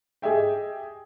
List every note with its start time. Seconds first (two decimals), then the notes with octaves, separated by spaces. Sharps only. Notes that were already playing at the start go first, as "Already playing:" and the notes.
0.22 G4 G#4 D#5 E5 G5